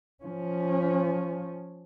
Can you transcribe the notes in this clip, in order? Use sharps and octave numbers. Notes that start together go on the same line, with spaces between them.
F3 C#4